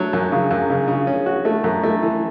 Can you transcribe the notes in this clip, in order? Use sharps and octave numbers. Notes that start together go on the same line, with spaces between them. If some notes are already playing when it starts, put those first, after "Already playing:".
Already playing: F#3 A3
F#2
C#3
F#2
C#3
C#3
C#4
F#4
A3
F#2
A3
E3